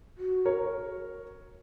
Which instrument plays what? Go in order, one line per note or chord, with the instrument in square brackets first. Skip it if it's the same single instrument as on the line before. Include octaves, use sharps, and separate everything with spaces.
[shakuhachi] F#4
[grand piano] A#4 C#5